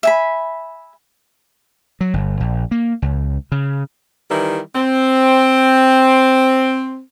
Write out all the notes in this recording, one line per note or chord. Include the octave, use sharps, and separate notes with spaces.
E5 G#5 B5
F#3
G1
A#1
A#3
C#2
C#3
D#3 E3 G3 E4
C4